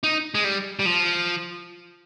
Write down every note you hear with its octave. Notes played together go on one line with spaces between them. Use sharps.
D#4
G#3
G3
G3
F3